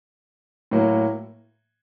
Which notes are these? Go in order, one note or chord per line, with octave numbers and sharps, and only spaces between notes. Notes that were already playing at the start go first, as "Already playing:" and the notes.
A2 F#3 A#3